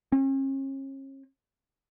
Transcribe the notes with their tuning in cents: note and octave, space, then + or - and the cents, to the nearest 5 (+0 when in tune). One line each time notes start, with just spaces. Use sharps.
C#4 -40